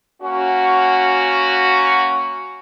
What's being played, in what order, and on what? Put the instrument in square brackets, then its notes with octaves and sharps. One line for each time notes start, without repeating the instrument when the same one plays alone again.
[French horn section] A#3 C#4 F#4